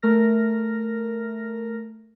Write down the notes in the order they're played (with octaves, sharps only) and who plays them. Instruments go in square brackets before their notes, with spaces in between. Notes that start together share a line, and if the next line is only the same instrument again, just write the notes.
[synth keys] A3 A#4 F6 A#6